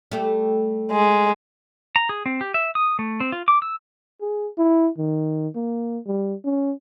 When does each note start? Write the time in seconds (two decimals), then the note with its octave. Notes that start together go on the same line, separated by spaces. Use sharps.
0.11 G3 A3 G4
0.92 G#3
1.96 A#5
2.09 G#4
2.26 C4
2.41 G4
2.54 E5
2.75 D#6
2.99 A3
3.20 C4
3.32 F4
3.48 D6
3.62 E6
4.21 G#4
4.58 E4
4.98 D#3
5.55 A#3
6.06 G3
6.45 C#4